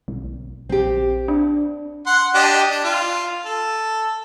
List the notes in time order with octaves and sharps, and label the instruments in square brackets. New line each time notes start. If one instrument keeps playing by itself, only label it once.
[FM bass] B1
[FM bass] A#1 [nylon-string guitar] C4 G4
[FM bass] D4
[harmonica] F#5 C6
D4 G4 D#5
D4
F4
A4